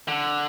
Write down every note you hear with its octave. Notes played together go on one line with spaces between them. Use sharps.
D3